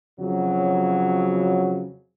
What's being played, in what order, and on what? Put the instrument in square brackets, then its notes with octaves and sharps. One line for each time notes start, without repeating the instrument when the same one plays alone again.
[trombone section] F2 C#3 F#3